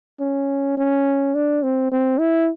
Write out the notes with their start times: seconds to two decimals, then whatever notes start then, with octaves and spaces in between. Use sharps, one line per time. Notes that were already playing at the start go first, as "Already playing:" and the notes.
0.20 C#4
0.77 C#4
1.35 D4
1.63 C4
1.92 C4
2.19 E4